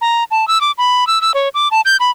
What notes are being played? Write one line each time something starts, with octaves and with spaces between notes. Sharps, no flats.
A#5
A5
E6
D6
B5
E6
E6
C#5
D6
A5
G6
B5